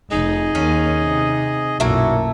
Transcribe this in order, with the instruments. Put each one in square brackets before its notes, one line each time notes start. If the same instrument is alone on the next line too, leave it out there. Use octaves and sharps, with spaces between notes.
[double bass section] F1 [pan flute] D#4 [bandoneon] G#4 D#5
[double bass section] D#2 [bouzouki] C#4
[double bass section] C3
[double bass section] B1 F#2 A#2 [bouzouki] A3 A#3 E4 [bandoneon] F#4